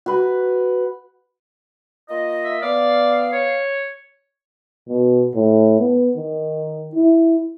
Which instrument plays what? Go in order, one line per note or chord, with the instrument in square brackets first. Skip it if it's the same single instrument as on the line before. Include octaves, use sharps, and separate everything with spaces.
[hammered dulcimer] F#4 B4
[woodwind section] A#3 F4 D#5
[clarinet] E5
[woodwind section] B3 F5 [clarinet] D5
[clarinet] C#5
[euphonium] B2
A2
B3
D#3
E4